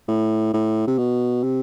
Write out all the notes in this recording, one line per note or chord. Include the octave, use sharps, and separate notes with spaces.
A2
A2
C3
B2
C3